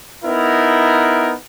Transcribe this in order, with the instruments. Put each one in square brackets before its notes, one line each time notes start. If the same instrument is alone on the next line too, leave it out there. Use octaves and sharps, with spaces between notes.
[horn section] B3 D#4 E4 A#4